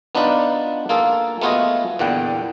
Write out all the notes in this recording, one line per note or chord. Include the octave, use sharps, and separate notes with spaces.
B3 D4 D#4 F4 B4 D5
A#3 F4 G#4 A4
A3 B3 F4 F#4 G#4 D#5
E2 A#2 D3 F#5 G5